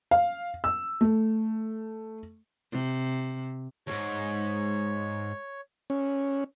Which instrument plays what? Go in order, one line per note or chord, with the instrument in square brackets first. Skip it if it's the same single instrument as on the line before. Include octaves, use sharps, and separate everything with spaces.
[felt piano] F5
E6
A3
[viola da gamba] C3
[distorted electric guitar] D#2 G#2 [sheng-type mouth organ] C#5
[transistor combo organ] C#4